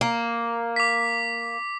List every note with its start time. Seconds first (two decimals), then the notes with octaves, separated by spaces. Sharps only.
0.01 A#3
0.76 D6 B6